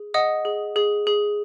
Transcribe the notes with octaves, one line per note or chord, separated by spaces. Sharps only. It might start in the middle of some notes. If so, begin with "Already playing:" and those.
Already playing: G#4
D#5 F#5 D#6
G#4
G#4
G#4